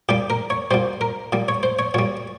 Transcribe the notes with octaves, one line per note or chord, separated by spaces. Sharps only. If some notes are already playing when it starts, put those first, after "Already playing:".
A#2 G3 G4
A#4
C#5
A#2 G3 C5
A#4
A#2 G3
C#5
C5
C#5
A#2 G3 C#5